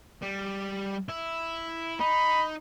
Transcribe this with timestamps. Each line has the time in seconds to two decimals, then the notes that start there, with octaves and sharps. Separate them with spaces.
0.22 G3
1.09 E4
2.00 D#4 B5